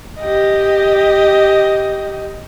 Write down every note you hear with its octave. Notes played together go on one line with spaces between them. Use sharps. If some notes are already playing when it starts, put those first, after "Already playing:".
G4 D#5